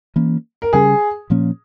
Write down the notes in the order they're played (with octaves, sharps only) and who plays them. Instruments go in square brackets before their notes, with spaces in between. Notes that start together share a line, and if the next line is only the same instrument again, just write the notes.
[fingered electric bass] E3 A#3 C#4
[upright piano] A#4
[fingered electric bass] C#3 G3 C#4 [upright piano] G#4
[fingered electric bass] A#2 F3 A#3 C#4